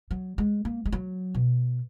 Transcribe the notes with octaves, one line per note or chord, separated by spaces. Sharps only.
F#3
G#3
A#3
G#3
F#3
B2